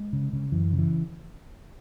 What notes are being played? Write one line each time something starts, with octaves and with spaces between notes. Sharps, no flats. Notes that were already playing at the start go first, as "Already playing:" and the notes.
Already playing: G#3
C#3
C#3
F#2 E3
C#3
E3